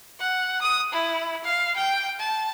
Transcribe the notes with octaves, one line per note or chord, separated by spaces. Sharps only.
F#5
D#6
E4
F5
G5
A5